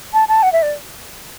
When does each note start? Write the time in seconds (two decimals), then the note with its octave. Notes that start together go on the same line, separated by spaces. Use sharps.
0.13 A5
0.28 A5
0.43 F#5
0.53 E5
0.62 D5